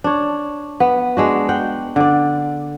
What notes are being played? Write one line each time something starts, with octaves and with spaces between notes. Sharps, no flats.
D4 C#5
B3
G#3 D4 F#4
F#5 G5
D3 D5